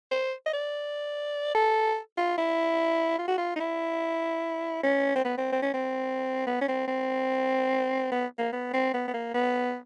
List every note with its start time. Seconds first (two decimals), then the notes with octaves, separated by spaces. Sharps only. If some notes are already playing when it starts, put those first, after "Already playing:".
0.11 C5
0.46 D#5
0.53 D5
1.55 A4
2.17 F4
2.38 E4
3.19 F4
3.28 F#4
3.38 F4
3.56 D#4
3.60 E4
4.83 C#4
5.16 C4
5.25 B3
5.38 C4
5.52 C4
5.62 C#4
5.74 C4
6.47 B3
6.61 C#4
6.68 C4
6.88 C4
8.11 B3
8.39 A#3
8.53 B3
8.74 C4
8.94 B3
9.08 B3
9.14 A#3
9.34 B3